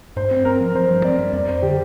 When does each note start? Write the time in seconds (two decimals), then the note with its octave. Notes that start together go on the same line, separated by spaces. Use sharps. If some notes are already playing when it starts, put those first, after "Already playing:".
0.16 G2 C5
0.31 C4
0.45 C4 A#4
0.60 F3
0.75 F3 C5
0.89 G2
1.04 C4 D5
1.18 G2
1.33 F2 D5
1.48 F2 C5
1.62 D3 G4